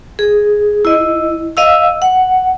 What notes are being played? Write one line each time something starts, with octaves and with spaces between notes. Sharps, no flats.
G#4
E4 D#5
D#5 F5 E6
F#5